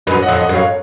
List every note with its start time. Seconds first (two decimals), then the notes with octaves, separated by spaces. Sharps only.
0.07 F#2 B4 D#5
0.22 D#5 F#5
0.28 F2
0.38 D#5 F#5
0.49 F#2
0.54 C#5 F5